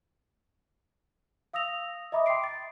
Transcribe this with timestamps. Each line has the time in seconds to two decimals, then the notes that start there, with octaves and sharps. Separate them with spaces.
1.53 F5 D#6 E6 A#6 F7
2.12 D#5 E5 A#5 B5 D6 D#6
2.26 G5 C6 D6 C7 D7
2.44 A6